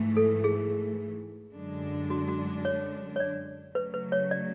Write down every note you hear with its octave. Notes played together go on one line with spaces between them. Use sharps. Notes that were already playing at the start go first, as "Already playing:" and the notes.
Already playing: G#2 E3 A3
A4
G#4
F#2 D3 G#3 D4
F#4
F#4
C#5
C#5
D5
C#3 F#3 A3 B4
B4
C#5
D5